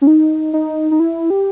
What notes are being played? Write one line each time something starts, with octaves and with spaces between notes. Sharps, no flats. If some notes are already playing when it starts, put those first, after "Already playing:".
C#4
D#4
D#4
D#4
E4
G4